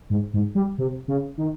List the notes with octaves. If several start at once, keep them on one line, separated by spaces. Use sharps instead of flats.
G#2
G#2
G3
C3
C#3
D#3